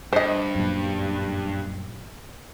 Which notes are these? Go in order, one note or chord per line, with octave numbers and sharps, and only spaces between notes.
G2 C5 D#5
F#2 A#2